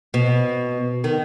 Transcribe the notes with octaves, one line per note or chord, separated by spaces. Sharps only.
B2
D#3